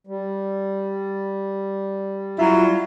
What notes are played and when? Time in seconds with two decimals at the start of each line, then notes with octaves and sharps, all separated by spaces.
0.07 G3
2.39 F#3 E4 F4